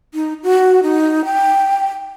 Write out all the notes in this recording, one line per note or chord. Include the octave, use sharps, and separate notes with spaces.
D#4
F#4
D#4
G5